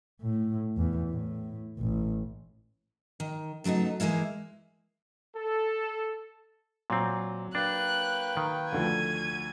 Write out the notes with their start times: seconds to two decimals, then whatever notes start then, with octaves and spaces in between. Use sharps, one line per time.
0.22 A2
0.77 E2
1.10 A2
1.79 A1
3.20 D#3
3.64 C#3 F#3 A3 B3 D#4
4.00 E3 G#3 A#3 E4 F5
5.36 A4
6.90 A#2 F#3 C4
7.55 A#3 D4 B4 G5 F#6
8.37 D#3
8.72 D2 D3 F3 G#6 D#7